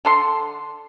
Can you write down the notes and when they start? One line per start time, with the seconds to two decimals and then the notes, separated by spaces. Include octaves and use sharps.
0.05 D3 A4 C6